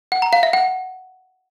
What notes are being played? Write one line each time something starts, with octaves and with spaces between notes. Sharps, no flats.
F#5
A#5
F5
E5
F#5